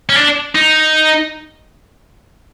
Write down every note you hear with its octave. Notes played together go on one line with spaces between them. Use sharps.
C#4
D4
D#4